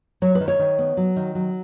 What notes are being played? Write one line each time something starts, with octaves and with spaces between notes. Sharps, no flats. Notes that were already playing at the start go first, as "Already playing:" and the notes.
F#3 C#5
B4
D#3
C#5
D#3
B3
F#3
D#3
F#3